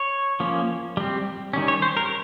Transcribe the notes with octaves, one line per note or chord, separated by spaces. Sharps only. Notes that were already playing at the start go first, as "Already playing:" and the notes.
Already playing: C#5
F3 A#3 C#4
G3 C4
D#3 G3 C#4
C#5
C5
A#4